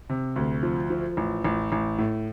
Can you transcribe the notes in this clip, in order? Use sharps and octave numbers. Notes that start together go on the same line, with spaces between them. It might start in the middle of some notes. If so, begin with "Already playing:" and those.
C3
D2
F3
F3
A1
A1
A1
A2